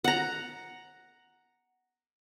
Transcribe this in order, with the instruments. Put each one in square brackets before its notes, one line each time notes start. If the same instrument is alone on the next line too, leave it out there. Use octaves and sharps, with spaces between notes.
[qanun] F#5 A#5